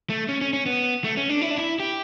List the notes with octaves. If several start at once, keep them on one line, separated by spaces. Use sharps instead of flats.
A3
C#4
C#4
C#4
B3
A3
C#4
D4
E4
D4
E4
G4